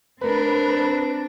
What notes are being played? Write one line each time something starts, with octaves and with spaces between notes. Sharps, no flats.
C4 D4 A#4 B4